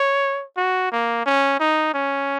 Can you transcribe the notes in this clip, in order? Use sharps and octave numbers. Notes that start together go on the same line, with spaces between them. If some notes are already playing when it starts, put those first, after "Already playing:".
Already playing: C#5
F#4
A#3
C#4
D#4
C#4